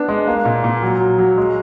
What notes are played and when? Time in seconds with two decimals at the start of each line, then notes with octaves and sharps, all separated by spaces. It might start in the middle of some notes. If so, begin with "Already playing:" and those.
Already playing: B3 D4
0.08 G#3
0.27 A#3
0.45 A#2
0.64 A#2
0.82 F#3
1.00 F#3
1.18 F#3
1.37 G#3